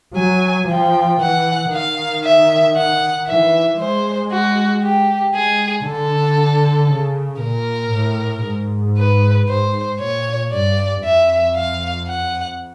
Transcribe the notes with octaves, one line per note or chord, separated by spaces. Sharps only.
F#3 G#5
F3 G5
E3 F#5
D#3 F5
E5
F#5
E3 E5
G#3 C5
F#4
G4
G#3 G#4
D3 A4
C#3
A#2 A#4
A2
G#2
B4
G#2 C5
A#2 C#5
G2 D5
F2 E5
F5
F#5